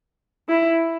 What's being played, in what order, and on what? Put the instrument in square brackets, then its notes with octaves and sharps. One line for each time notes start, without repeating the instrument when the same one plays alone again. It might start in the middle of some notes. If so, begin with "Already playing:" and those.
[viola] E4